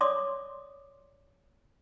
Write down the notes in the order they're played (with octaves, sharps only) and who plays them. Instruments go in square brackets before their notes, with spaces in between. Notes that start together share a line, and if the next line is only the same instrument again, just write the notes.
[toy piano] C#5 D5 C6 D6 D#6